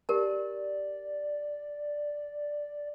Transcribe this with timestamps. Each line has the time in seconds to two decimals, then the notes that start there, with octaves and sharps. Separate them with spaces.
0.09 G4 A#4 D5 A5